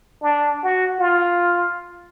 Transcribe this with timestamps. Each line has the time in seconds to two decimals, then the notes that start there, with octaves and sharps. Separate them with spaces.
0.22 D4
0.63 F#4
0.99 F4